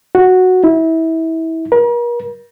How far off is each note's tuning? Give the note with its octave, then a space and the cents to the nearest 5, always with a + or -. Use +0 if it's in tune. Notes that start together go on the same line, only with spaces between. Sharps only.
F#4 -5
E4 -25
A#4 +40